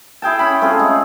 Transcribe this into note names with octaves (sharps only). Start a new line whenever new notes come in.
E4 G#4 G5 A5
C#4 G5 B5
A3 C4 F4 G#4
G#3 C#4